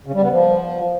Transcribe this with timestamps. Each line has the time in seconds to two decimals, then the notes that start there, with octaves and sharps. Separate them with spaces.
0.06 C#3
0.14 G3
0.22 B3
0.30 F3